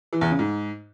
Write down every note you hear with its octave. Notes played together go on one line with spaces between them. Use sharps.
E3
E2
C#3
G#2